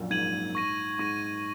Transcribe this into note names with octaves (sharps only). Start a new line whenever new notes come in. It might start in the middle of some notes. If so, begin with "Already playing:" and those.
Already playing: A#1 F#2 A#2
G#2 G#6 D#7 F#7
C#6 A#6 D#7
G#2 C#6 A#6 D#7